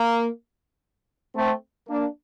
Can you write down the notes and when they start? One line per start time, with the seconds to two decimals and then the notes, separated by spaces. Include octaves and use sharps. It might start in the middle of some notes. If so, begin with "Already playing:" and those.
Already playing: A#3
1.35 A3 C4
1.89 A#3 D4